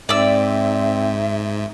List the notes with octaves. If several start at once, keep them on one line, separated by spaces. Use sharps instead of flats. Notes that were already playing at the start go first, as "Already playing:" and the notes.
G#2 C4 D5 E5 E6